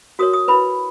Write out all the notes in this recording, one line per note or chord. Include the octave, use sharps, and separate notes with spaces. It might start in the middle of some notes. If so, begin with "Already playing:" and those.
F#4 A#4 C#5 D#6
D#6
E4 B4 B5